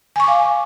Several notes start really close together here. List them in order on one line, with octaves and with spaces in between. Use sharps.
G#5 C#6 D6 F5